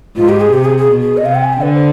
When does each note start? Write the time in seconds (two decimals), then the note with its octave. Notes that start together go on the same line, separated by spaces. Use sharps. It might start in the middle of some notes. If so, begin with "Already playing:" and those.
0.16 G#2 F4
0.29 G4
0.41 G#4
0.53 C3 G4
0.65 G#4
0.77 G#4
0.89 B2
1.01 G#4
1.17 D#5
1.25 C3 F5
1.35 G5
1.44 G#5
1.53 G5
1.62 D3 B4
1.74 C5